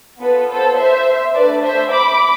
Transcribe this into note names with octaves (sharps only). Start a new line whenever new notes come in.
B3 F4 A4 B4
A4 C5
C5 E5
A3 D4 A4 B4 D5
C5 E5
B5 D6